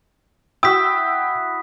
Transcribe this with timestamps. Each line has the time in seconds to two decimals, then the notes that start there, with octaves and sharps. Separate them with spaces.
0.63 E4 F#4 G5 D#6 E6 B6